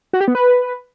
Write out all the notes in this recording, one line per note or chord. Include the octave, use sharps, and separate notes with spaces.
F#4
G4
B3
B4